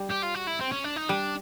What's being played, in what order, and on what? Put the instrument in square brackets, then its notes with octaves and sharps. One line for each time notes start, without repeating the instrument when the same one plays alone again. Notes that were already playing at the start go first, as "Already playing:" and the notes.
Already playing: [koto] G3
[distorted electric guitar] G4
F4
F#4
E4
C4
C#4
D4
D#4
[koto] G3 [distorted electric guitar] D4